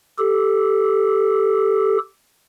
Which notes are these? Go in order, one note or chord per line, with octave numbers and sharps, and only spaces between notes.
G4 A4